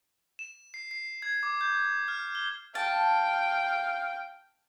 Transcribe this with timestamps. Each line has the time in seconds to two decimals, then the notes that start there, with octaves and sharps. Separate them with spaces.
0.39 E7
0.74 C7
0.91 C7
1.22 G#6
1.43 D6
1.61 G6
2.08 F6
2.35 G7
2.75 F5 G5 A5